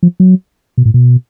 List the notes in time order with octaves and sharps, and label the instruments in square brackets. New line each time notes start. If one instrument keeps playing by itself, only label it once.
[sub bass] F3
F#3
B2
A2
B2